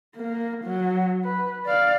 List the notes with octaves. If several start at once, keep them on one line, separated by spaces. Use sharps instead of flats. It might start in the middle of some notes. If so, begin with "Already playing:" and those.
A#3
F#3
B4
D5 F5